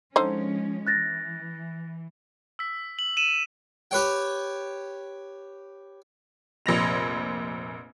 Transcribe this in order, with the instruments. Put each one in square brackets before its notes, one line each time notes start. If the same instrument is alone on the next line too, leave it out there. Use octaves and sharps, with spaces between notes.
[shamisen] D3 D#4 C5 [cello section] F3 G#3 C#4
[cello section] E3 [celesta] F#6 A6 A#6
[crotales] E6 B6
F#7
D#7 E7 F#7
[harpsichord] G4 B4 C#5 G5
[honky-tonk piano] F1 A#1 A#6 F7